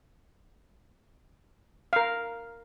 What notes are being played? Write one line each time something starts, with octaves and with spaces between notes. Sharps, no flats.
A#4 F5